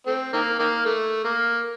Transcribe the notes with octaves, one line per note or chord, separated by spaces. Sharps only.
A3 C4
D#3 A#3
D#3 A#3
A3
A#3